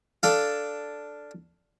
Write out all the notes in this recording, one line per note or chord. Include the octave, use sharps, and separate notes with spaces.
D4 A4 F5